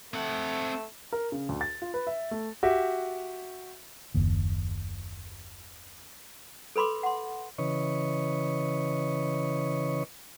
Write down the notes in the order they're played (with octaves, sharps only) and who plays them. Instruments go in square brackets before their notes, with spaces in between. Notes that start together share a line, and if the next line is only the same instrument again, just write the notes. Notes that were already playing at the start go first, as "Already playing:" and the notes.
[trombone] A3 [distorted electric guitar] C4 F#5
[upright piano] A#4
C#3
D2
A6
F4
B4
E5
A3
[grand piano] F#4 G4 E5
[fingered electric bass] F#1 D#2
[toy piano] A4 B4 B5 C6 D6
F#5 C6
[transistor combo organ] C#3 E3 B4 C#5 D#5 C#6